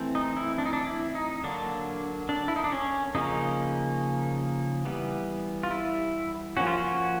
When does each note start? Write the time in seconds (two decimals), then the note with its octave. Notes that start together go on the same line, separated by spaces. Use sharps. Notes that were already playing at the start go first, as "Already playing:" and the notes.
Already playing: E3 A3 C4
0.15 D#4
0.37 E4
0.58 D4
0.66 D#4
0.73 D4
0.87 E4
1.15 D#4
1.44 D3 F#3 A#3 D4
2.29 D4
2.48 E4
2.56 D#4
2.64 D4
2.72 C#4
3.15 C#3 F3 A#3 C#4 D#4
4.85 E3 G3 B3
5.63 F4
5.71 E4
6.57 F3 A#3 C#4 F#4
6.67 F4
6.77 F#4